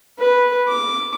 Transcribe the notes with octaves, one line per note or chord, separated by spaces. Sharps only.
B4
D6